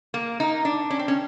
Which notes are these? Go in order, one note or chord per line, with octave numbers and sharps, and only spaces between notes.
A#3
D#4
D4
C#4
C4
C#4